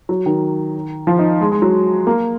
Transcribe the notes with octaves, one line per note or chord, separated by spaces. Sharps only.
F#3
D#3
F3
D#4
G#3
G#3
F#3
A#3